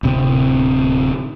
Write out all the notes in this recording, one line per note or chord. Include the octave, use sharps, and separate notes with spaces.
D1 C3 C4